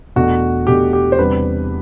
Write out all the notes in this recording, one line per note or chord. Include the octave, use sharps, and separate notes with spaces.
E2 B2 A3 D4 F#4
E2 B2 A3 D4 G4
G4
C5
E2 C3 G3 D4 B4